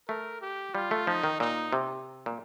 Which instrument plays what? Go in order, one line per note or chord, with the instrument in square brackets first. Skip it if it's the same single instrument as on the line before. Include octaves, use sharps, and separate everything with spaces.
[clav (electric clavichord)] A3 [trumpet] A#4
[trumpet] G4
[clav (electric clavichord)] G3 [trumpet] F4
[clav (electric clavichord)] A3
[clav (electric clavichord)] F3 [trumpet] D#4
[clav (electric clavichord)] D#3
[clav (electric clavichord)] A#2 [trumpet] D#4
[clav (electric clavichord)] C3
A#2